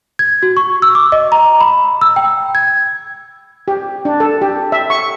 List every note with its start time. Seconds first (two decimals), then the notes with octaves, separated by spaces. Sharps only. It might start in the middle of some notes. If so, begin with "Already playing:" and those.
0.19 G#6
0.43 F#4
0.57 C#6
0.82 E6
0.95 D6
1.12 D#5
1.32 A#5
1.61 B5
2.01 E6
2.16 G5
2.55 G#6
3.68 G4
4.05 D4
4.20 A4
4.41 G4
4.72 E5
4.90 C#6